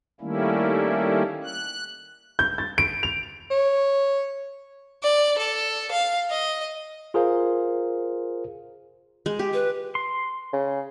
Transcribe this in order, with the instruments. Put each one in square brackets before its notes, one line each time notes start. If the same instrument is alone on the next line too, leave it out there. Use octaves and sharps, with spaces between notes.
[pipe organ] D#3 G3 A3 A#3 C#4 E4
F#6
[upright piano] G6
A6
D7
F7
[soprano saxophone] C#5
[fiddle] D5
A4
F5
D#5
[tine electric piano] F4 G#4 A#4 C5 F5
[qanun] G#3
G4
[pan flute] B4
[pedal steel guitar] C6
[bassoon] C#3